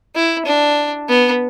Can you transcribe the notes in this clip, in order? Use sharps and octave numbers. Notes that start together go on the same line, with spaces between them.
E4
D4
B3